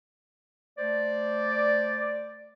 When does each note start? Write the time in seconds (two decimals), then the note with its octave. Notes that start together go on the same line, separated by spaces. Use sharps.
0.78 A3 C5 D5